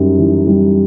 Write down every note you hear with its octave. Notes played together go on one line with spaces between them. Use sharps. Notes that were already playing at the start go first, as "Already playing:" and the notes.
Already playing: F#2 G3 D#4
E3
G3